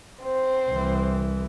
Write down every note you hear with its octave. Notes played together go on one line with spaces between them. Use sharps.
C4 C5
C2 E3